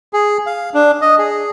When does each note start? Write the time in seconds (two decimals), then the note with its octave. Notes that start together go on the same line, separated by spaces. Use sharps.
0.13 G#4
0.46 F5
0.74 D4
1.01 D#5
1.18 G#4